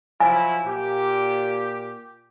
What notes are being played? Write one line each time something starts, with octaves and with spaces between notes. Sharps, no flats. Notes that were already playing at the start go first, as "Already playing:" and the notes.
F3 F#3 E4 G#5
A#2 G4